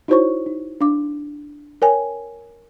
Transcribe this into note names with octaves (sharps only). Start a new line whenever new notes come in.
D#4 E4 F#4 C5 C#5 C#6
D#4
D4 F5 D6
A#4 C#5 G5 G#5